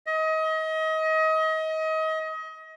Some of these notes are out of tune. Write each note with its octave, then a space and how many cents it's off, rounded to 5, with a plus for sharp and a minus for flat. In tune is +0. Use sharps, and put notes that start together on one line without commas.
D#5 +30